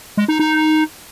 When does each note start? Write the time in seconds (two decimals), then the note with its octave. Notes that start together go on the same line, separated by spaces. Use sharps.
0.17 G#3
0.28 D#4
0.39 D#4